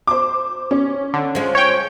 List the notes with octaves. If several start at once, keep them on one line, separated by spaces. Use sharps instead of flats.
C5 D6
C#4
D3
F3 G#3
C#5 G5